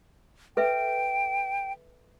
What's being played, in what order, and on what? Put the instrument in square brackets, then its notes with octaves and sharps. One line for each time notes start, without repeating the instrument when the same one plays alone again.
[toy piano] A4 B4 E5 [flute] G5